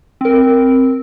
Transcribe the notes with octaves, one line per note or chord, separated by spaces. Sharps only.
C4 A#4